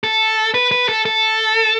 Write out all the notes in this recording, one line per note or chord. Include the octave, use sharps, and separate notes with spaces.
A4
B4
B4
A4
A4